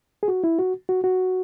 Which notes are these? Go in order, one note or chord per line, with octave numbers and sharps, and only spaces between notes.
G#4
F#4
E4
F#4
F#4
F#4